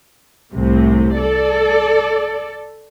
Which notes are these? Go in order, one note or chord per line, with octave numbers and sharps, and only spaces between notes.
C2 A2 C3
A4 D5